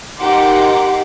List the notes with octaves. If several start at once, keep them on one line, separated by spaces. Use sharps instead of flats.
D#4 G4 A#4 F#5 C6 D6